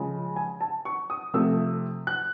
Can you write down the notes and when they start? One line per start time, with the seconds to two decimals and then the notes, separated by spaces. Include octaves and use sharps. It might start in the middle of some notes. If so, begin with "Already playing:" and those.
Already playing: C#3 F3 G#3
0.36 G#5
0.61 A5
0.85 C#6
1.10 D#6
1.34 C3 F3 A3 E6
2.07 F#6